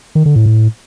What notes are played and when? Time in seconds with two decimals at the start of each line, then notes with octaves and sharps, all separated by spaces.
0.15 D#3
0.26 D3
0.36 A2
0.46 A2